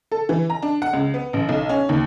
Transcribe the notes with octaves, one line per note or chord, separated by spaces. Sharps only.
A4
E3
A#5
D4
F#5
C#2
B3
A1
B1
C#4
D#2